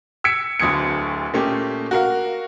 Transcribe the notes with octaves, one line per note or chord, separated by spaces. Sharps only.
E6 G#6 B6 C#7 D7
D1 D2 D3 D#6 G#6 C#7
A#2 A3 A#3 C#4 G4
F#4 A#4 F5